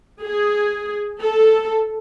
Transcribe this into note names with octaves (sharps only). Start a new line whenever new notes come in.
G#4
A4